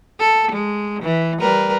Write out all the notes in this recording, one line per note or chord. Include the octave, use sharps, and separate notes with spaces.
A4
G#3
E3
G3 A#4 B4